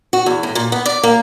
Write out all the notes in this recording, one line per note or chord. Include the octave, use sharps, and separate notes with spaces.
F#4
E2
A2
A#2
B3
D5
A#3